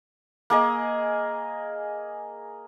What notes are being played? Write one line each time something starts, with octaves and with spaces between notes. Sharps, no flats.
A#3 G#4 D#5